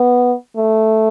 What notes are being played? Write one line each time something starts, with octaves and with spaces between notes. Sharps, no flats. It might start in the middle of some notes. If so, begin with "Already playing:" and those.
Already playing: B3
A3